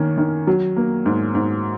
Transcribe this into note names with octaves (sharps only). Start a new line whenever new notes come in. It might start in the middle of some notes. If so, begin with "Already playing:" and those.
Already playing: D#3 A#3 C#4
D#3
F#3
A#3
G#2
G#2